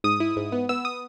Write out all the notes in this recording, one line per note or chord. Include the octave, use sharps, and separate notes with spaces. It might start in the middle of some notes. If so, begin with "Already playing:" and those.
G#2 D#6
E4
G#2
B3
B3 E6
D#6